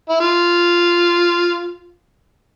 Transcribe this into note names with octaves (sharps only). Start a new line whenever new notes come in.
E4
F4